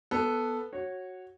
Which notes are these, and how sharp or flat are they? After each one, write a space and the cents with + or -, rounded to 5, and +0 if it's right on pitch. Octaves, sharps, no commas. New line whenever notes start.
B3 -5 A4 +0
F#4 +0 C#5 -15